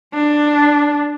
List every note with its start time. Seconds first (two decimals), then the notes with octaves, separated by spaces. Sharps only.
0.14 D4